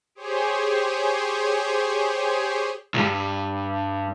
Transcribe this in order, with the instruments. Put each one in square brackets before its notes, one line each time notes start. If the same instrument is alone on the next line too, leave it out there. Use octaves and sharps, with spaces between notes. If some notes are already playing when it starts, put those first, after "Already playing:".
[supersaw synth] G4 G#4 C5 C#5
[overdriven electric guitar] C2 G2